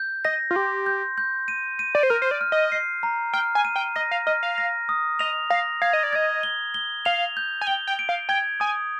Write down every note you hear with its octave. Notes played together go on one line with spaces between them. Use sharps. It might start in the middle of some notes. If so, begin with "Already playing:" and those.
Already playing: G6
D#5 A#6
F4
G4 C6
G6
G6
D#7
D#7
D5
C5
A#4 F6
C5
D5
F6
D#5
C7
A#5
G5 F6
G#5
D#7
G5
D#5 A#6
F5
D#5 F6
F5
A#6
D#6
D#5 F7
F5 A#6
F5 G#6
D#5
D5
D#5 G#6
G7
G7
F5 F7
G6
G#5
G5 G7
G5
D7
F5
G5 G#6
G#5 D#6